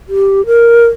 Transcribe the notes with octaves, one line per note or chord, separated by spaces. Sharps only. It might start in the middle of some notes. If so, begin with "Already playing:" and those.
G4
A#4